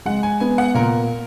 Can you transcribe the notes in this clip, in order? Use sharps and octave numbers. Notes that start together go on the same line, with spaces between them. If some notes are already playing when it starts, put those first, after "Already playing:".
G#3 F#5
G#5
B3 G#5
F#5
A#2 A#4